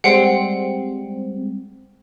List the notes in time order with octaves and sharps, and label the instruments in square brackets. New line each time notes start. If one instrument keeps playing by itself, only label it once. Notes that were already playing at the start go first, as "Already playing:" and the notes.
[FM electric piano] G3 G#3 C4 [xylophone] F#5 G5 C7